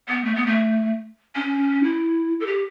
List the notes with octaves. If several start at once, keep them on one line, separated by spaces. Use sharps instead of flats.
B3
A3
B3
A3
C#4
E4
A4
G4